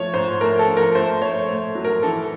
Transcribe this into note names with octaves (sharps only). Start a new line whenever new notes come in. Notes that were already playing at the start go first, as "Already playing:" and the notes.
Already playing: F3 A3 C#5
G#2 C5
A3 A#4
A4
F3
A#4
A3 C5
A3 C#5
A3
F#3
A#4
E3 A4